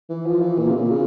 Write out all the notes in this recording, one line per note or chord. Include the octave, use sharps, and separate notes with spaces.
E3
F3
E3
A#2
C#3
A#2
C#3